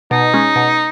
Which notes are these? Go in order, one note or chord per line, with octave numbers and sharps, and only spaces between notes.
B2 D#4
G#3 C#4
B2